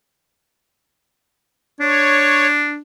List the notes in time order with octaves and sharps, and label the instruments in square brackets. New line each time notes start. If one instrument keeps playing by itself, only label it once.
[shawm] D4 [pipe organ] C#5